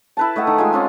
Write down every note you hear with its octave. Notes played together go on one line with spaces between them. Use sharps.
E4 B4 A5
A3 D#5 F#5 G5
D#3
G#3 F4 G#5
C4 C#4 F4 F#5